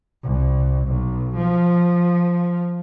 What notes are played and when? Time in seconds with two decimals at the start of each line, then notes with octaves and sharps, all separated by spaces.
0.24 C2
0.88 B1
1.36 F3